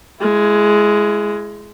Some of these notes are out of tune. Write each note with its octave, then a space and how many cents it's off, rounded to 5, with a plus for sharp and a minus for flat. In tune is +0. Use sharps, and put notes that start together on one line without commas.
G#3 +10 E4 +35